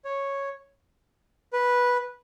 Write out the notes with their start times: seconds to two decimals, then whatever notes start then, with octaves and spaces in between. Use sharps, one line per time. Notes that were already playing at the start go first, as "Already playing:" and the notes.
0.05 C#5
1.53 B4